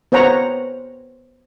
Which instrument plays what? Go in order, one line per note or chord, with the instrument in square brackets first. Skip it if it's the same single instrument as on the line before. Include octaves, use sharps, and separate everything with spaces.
[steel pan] B3 C5 C#5 F#5 A#5